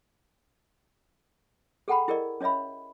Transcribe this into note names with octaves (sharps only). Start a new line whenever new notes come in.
G#4 A4 F#5 G5 A#5 B5
E4 G#4 A#4 D5 D#5
C#4 C#5 D#5 E5 B5